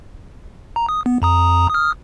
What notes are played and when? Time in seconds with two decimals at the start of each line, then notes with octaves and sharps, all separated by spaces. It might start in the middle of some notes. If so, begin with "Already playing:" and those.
0.76 A#5
0.89 D#6
1.06 B3
1.22 F2 A#5 D#6
1.70 D#6 F6